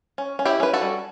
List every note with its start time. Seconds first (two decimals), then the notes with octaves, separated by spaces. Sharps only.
0.18 C#4
0.39 C#4
0.45 E4 G4
0.60 C#4 B4
0.74 F#4 A4
0.82 G3